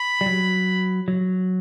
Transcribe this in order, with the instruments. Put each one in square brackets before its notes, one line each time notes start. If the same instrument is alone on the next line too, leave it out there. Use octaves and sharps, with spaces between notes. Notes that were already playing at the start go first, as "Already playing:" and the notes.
Already playing: [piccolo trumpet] B5
[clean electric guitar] G3
F#3
F#3